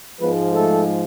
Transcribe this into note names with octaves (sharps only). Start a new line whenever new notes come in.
G#2 F3 G#3 B3 B4
A3 A4